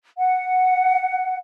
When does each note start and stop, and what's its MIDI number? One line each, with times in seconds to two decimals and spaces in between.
0.18 1.38 78